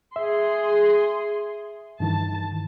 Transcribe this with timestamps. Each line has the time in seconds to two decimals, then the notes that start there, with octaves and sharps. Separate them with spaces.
0.16 G#4 E5 C6
2.00 G2 D#3 E3 A5